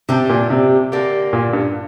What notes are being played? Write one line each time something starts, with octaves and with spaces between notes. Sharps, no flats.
C3 G3 D4 G4
A#2
C3
D3 A#3 G4
A#2
G2